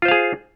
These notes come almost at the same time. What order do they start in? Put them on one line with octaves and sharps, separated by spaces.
F4 C5 F5 G#4